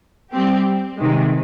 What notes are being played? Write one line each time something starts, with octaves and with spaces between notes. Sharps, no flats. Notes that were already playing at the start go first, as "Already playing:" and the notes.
G3 C4 G4
C3 D#3 G#3